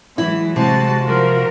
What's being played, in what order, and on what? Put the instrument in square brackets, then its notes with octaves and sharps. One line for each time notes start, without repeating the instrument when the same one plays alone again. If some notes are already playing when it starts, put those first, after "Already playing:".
[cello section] E3 F#3 G#3 [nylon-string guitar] E4
[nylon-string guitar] C3 [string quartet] G#3 A5 [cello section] F#4
[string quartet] F3 [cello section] F4 F#4 A#4